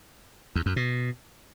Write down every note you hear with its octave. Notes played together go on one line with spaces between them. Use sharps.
E2
F#2
B2